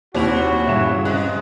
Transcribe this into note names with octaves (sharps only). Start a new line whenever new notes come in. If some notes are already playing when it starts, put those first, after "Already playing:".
D#2 C3 F#3 E4 F#4 G#4 C5 F7
G2 C#3 E3 E5 E7
F#2 C3 G#3 D#5 F#6